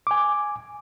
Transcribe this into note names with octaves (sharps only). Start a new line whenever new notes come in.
G#5 D6